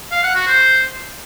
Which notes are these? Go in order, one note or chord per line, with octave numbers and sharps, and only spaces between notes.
F5
F#5
F#4
C5